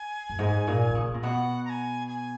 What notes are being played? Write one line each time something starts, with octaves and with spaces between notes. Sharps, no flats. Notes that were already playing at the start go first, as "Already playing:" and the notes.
Already playing: G#5
F#2
G#2
A#2
D#3
C#3
A#2
B2 F#5
A#5
G#5
G#5